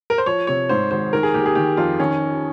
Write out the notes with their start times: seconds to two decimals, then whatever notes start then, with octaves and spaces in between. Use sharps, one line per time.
0.10 A#4
0.18 C5
0.26 F3 C#5
0.47 C3 C#5
0.69 G#2 C5
0.91 G#1 C5
1.13 D#3 A#4
1.23 G#4
1.34 D#2 G4
1.46 G#4
1.55 D#3 G4
1.77 F2 F4
1.99 D#3 C#4